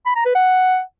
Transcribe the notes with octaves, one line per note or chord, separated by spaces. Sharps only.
B5
A#5
B4
F#5